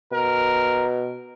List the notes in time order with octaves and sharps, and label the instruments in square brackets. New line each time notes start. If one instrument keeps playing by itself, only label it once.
[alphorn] B2 [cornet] A#4